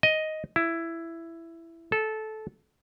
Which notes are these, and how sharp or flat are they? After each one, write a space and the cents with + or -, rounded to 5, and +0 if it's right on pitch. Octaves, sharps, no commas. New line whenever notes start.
D#5 +5
E4 +10
A4 -15